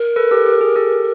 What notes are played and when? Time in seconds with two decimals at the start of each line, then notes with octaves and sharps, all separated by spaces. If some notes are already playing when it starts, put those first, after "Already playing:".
Already playing: A#4
0.16 A4 B4
0.31 G4 A4
0.46 G4
0.61 G#4
0.76 G4 A4